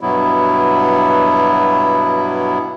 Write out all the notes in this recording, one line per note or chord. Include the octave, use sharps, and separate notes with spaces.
G2 B2 F#3 B3 E4